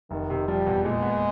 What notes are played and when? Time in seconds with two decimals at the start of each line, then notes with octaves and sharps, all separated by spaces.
0.11 F1 D#3
0.30 C3
0.48 F3 G3
0.67 E2
0.84 A#2 G#3
1.02 B3